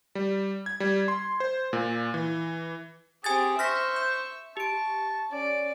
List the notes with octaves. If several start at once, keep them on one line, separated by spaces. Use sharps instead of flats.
G3
G#6
G3
C6
C5
A#2
E3
C4 G4 G#4 G#5 G#6 A6
C5 E5 C#6 F6 A#6 B6
G6
G4 A5 C#6 D7
C#4 D5